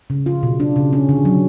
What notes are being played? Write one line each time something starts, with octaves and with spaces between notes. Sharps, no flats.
C#3
F4
B2
D4
C#3
C#4
D3
F#3